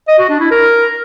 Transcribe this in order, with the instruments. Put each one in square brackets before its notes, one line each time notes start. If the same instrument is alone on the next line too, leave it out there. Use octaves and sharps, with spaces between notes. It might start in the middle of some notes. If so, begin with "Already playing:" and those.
[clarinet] D#5
F#4
D4
E4
A#4